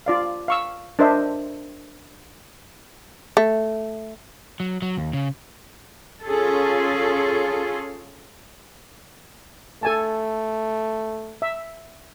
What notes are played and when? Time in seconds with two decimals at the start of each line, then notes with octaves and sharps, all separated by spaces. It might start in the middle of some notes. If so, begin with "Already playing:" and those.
0.06 F4 D5 F5
0.48 F5 C#6 E6
0.99 D4 A#4 C5 D#5 E5
3.37 A3
4.60 F#3
4.82 F#3
4.98 D#2
5.13 C#3
6.25 C#4 F4 G#4 A4
9.83 A3 A4 G#5 A5
11.42 E5